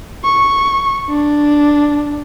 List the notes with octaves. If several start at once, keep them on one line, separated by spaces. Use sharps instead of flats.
C#6
D4